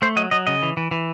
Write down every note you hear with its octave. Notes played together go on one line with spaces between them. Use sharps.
A3 C5
F#3 D#5
F#3 D#5
C#3 D#5
E3
E3
E3